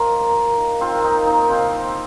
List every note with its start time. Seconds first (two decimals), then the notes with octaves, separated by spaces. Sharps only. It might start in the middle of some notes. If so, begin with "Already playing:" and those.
Already playing: F3 F4 A#4 D#5
0.12 A#3
0.34 A#3
0.57 D#3
0.81 D#3 C4 F4
1.04 A#3 D#4
1.26 A#3 D#4
1.49 C3 C4 F4
1.72 F3